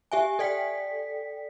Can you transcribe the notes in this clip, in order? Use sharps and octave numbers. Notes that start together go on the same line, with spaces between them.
G4 E5 G#5
A4 D5 G5 B6